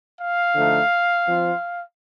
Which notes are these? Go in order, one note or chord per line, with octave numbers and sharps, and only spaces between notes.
F5
D3 F3 A3 D#4
F3 C4 F4